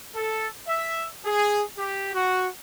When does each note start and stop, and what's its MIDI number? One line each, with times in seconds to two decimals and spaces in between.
0.15 0.47 69
0.68 1.06 76
1.25 1.62 68
1.78 2.10 67
2.13 2.47 66